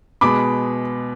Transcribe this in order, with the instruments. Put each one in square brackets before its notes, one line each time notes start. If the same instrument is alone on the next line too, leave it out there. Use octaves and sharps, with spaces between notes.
[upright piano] B2 G#3 B3 B5 D6